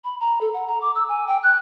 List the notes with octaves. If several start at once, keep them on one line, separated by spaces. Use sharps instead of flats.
B5
A#5
A4
F#5
A#5
D6
E6
G#5
G5
F#6